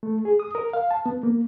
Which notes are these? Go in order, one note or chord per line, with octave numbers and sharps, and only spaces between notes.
A3
G#4
D#6
A#4
F5
A5
B3
A#3